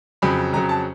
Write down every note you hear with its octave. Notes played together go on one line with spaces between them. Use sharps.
F2 C#3 F#3 B5
F2 C#3 F#3 A#5
A5